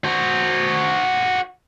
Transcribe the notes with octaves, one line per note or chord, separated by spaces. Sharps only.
F#4 C5